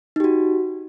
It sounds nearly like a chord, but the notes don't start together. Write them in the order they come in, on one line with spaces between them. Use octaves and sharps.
D#4 G4 F#4